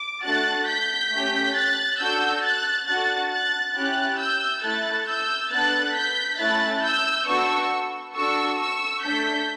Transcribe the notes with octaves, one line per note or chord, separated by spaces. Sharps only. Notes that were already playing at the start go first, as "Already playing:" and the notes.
Already playing: D6
A3 D4 F#4 A4 F#6 A6
G6 B6
A3 C#4 G4
F#6 A6
D4 F#4 A4 E6 G6
F#6 A6
D4 F#4 A4 F#6 A6
F#6 A6
C#4 E4 G4 F#6 A6
E6 G6
A3 E4 A4 F#6 A6
E6 G6
B3 D4 A4 F#6 A6
G6 B6
A3 C#4 E4 A4 F#6 A6
E6 G6
B3 D4 F#4 A4 C#6 E6
D4 F#4 A4 C#6 E6
C#6 E6
A3 D4 A4 G6 B6